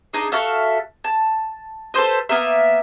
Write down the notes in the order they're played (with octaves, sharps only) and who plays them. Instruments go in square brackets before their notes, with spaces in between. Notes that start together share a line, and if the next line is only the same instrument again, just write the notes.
[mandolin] D4 D#4 G#4
F#4 A4 E5 F5
A5
A4 B4 C5 D#5
A#3 B3 A#4 E5